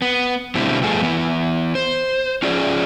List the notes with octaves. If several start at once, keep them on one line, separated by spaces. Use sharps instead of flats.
B3
B2 D3 G3 A3 C4 E4
G2 F3 A3 B3 G#4
E3 B3
C5
C#4 F4 G#4 D5